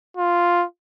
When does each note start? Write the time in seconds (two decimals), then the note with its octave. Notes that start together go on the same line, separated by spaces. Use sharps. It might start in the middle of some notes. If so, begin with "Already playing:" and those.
0.17 F4